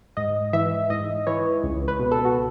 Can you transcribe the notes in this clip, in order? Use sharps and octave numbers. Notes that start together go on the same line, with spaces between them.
G#2 D#5
E3 E5
G#2 D#5
E3 C#5
C#2
B4
B2
A4
F#4